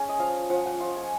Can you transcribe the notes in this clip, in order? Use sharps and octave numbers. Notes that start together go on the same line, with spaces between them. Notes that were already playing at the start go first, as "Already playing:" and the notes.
Already playing: G#3 C#4 G#5
D#5
F3 F5
F3 F#5
F#5
F4 F#5
G#5